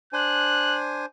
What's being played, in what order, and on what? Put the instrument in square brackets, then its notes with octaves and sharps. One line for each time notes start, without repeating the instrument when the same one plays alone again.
[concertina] D4 C5 G#5 [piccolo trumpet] F#6